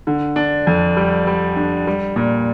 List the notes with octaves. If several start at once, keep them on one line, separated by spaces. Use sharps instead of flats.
D3
D4
F2
G3
G3
D4
G3
A#2